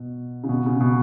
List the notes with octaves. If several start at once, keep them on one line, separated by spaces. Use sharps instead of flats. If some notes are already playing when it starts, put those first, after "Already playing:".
Already playing: B2
C#3
B2
C#3
B2